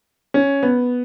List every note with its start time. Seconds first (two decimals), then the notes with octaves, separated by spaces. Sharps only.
0.34 C#4
0.63 B3